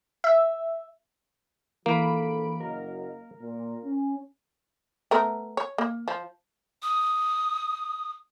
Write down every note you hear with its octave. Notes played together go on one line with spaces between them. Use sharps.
E5
A#1 E3 F3 A#3 A4 B5 D7
F#1 F#3 A#4 D#5
A#2
C#4
A3 B3 A#4
C#5
A#3
F3
D#6